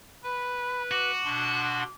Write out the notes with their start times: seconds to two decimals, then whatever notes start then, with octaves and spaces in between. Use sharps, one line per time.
0.24 B4 B5
0.91 F#4 D6
1.25 B2 D4 C6